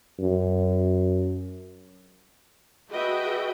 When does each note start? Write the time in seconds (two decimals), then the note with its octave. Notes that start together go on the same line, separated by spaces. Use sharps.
0.20 F#2
2.89 F#4 G#4 B4 D#5 E5 G5